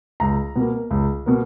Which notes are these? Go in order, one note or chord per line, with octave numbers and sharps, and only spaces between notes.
C#2 A#5
B2 A#3
C#2
B2 A#3